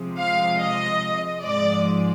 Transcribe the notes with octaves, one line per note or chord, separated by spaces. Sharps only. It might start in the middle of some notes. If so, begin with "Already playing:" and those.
Already playing: C3 F3 G#3
F5
D#5
G#2 F3 G#3 D5